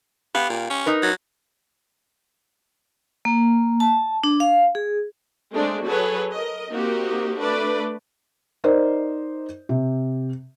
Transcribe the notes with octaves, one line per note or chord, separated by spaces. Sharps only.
B3 G4 F5
A#2
C#4
D#4 A#4 B4
F#3
A#3
A5
D4
F5
G#4
G#3 A3 C4 D4
F#3 F#4 G#4 A4 B4 C#5
A#4 D#5
A#3 C4 D#4 F#4 G4
A3 D4 B4 D5
D#4 A#4 C5 D5 D#5
C3